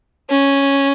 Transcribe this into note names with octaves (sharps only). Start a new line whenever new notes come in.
C#4